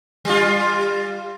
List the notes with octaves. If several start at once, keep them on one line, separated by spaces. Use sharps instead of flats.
G3 F4